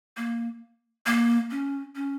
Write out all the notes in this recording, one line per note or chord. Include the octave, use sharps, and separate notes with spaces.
A#3
A#3
C#4
C#4